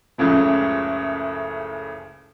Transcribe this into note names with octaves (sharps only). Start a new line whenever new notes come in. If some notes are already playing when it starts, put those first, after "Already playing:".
F#1 C#2 A2 C#3 F3